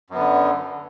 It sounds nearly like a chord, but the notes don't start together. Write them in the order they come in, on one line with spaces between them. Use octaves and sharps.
F#2 B3 D3